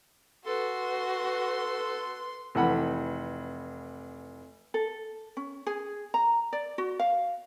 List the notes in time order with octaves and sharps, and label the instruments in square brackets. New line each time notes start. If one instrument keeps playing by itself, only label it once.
[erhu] F#4 [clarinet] A4 [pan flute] B4 [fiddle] C6
[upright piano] F1 E3 F#5 B5
[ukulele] A4
C#4
G#4
A#5
D5
F#4
F5